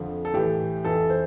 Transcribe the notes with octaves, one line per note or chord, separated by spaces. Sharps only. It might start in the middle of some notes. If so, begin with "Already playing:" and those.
Already playing: F2 D3 F3
A4
A2 E3 G4
F2 E3 A4
C5